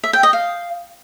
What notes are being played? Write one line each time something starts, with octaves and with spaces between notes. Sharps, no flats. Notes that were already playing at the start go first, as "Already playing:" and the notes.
E5
G5
D#5
F5